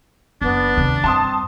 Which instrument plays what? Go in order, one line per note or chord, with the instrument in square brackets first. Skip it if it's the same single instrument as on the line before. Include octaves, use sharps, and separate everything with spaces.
[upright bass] F#1 [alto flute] B3 [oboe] D4
[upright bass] D#2 C3
[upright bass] G2 [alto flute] C4 [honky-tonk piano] A5 C6 D#6